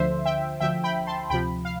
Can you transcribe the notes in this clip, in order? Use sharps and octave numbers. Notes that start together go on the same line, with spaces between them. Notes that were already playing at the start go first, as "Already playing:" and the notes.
Already playing: D2 D3 F3 C5 E5
E5 G5
D2 D3 F3 E5 G5
G5 B5
A5 C6
D2 C3 F3 G5 B5
F5